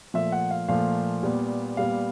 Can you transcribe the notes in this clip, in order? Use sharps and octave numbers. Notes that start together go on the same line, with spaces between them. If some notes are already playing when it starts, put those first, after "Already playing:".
A#2 F3 A3 E5
F#5
F5
A#2 F3 A3 F5
A#2 G3 B3
A#2 G3 B3 F5